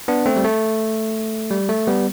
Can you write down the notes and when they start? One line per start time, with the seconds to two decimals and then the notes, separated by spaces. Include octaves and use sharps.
0.08 B3 D4
0.26 A3 C4
0.36 G3
0.44 A3
1.51 G3
1.69 A3
1.87 G3 B3